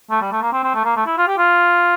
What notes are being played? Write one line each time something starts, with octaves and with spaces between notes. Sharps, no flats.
A3
G3
A3
A#3
C4
C4
A3
A#3
A3
E4
F4
G4
F4